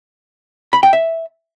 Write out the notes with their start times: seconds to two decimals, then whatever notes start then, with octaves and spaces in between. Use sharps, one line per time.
0.73 B5
0.83 G5
0.93 E5